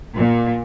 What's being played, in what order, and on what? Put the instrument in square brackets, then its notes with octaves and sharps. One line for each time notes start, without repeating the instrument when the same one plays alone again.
[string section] A#2